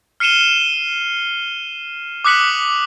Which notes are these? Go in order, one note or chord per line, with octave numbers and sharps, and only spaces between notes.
F6 C7 C#7 D#7 E7 G7
D6 D#6 F#6 B6 C#7 F#7